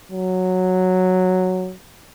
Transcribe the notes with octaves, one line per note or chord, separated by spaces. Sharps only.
F#3